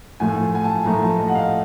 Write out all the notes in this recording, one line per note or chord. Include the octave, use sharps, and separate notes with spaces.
A2 F3 A3 G#5
G#5
A5
A2 F3 A3 A#5
A5
D#5
F#5
F5